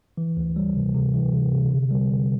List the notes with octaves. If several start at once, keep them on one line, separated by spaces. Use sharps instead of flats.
E3
D2
G3
C3
C3
E3
C3
C3
D3
G3
D3